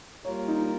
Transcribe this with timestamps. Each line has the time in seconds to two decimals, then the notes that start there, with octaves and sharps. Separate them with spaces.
0.25 G3 A#3 F4 A#4 C#5
0.48 D#4